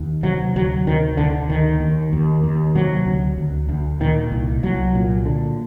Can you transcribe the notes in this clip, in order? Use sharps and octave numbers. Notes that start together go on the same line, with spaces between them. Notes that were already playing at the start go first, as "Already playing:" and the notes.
Already playing: D#2
C3 F#3
D2 F#3
C3 D#3
D2 D3
D#2 D#3
D#2
D#2
D#2
C3 F#3
D2
D2
D2
A#2 D#3
C2
C2 F#3
A#2
D3